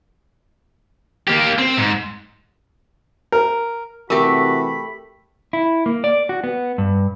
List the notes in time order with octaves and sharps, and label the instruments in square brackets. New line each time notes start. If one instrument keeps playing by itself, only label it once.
[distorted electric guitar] A#3 G4
C4
G#2
[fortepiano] A#4
[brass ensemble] C3 E3 F#4 [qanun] A3 G4 [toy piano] A#4 [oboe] B5
[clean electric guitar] E4
A#3
D5
F#4
B3
G2